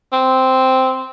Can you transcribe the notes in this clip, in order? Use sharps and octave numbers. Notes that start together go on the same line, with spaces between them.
C4